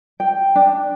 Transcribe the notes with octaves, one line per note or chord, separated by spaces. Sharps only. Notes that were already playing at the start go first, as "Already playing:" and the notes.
G5
D4